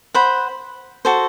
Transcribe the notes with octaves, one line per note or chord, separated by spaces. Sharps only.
C5 F#5 B5
F#4 A4 C5